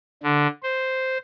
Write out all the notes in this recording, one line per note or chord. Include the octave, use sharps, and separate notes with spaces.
D3
C5